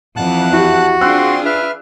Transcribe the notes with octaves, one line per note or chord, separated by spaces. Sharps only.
F2 E3 F#5 A5 F#6
E4 F#4 G4
C4 D4 F4 G#4 C6 E6 F#6
B4 E5 F6